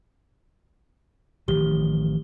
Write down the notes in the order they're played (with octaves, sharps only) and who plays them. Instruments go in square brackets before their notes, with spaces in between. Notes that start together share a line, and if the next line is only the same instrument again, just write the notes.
[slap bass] A1 D#3 F3 [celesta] G4 G7